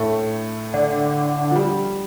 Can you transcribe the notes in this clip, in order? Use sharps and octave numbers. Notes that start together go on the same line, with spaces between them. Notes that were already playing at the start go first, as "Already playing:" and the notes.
Already playing: A2 A3
D3
F3
G3